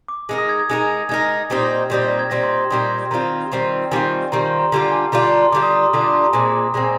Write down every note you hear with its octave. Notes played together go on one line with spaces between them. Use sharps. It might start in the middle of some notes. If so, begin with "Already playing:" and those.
D6
G#3 D#4 A#4
D#6
G#6
G#6
G#3 D#4 A#4
G#3 D#4 A#4 G#6
A#6
A#2 G3 C4 D#4
A#2 G3 C4 D#4
G#6
A#2 G3 C4 D#4 A#6
C6
C6
A#2 G3 C4 D#4 C6
D#3 G3 C4 F4 A#5
D#3 G3 C4 F4
D#3 G3 C4 F4 G#5
D#3 G3 C4 F4 A#5
C6
A#5
D3 G3 D4 F4 A#5
G#5
D3 G3 D4 F4 A#5
C6
A#5
C6
D3 G3 D4 F4 D6
D#6
A#5
C6
D3 G3 D4 F4 D#6
D6
C6
A#5
A#2 G#3 C4 G#5
A#2 G#3 C4